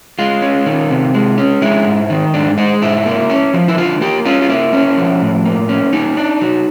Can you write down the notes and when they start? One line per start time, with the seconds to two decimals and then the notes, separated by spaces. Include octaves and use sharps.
0.19 G#3 F4
0.42 C#4
0.66 D#3
0.90 C3
1.14 G#3
1.38 C#4
1.62 G#3 E4
1.86 G#2
2.10 D#3
2.34 G#2 D4
2.58 G#3 D#4
2.82 G#2 E4
3.06 A#3
3.30 C#4
3.54 F3
3.68 E4
3.77 D3 F4
4.01 A#3 G4
4.25 C#4 F4
4.41 F4
4.49 A#3 E4
4.73 C#4
4.97 F3
5.21 A2
5.45 A#3
5.69 C#4
5.93 A#3 D#4
6.17 D4
6.41 F#3